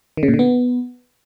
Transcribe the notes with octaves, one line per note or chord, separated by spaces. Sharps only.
D#3
C#3
A#2
D3
B3